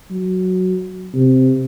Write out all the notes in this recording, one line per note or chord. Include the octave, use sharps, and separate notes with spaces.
F#3
C3